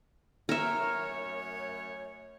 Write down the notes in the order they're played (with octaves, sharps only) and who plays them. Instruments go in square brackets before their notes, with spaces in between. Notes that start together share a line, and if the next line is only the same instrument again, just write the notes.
[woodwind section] F#2 A3 C#5 [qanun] A#4 E5